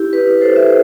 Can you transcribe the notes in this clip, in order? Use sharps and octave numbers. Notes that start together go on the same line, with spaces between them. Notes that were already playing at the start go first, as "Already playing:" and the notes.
Already playing: E4 G4
G4 B4
A4 C5
C5 E5